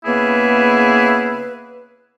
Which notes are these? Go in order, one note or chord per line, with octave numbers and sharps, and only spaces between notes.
C#3 A#3 B3 E4 G#4 B4